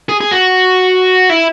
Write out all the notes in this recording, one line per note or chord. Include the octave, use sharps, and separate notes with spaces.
G#4
G#4
F#4
E4